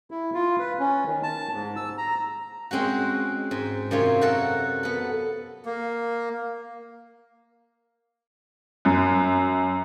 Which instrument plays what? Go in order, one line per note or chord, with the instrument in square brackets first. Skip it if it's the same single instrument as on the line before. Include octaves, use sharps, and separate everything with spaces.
[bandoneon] E4
F4
B4
C#4
D#3
A5
G#2
E6
A#5
[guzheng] G#3 C4 C#4 F#4
G#2
F#2 C3 F4 C#5
F#4 A4 A#4
B3 A4
[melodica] A#3
[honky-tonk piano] F#2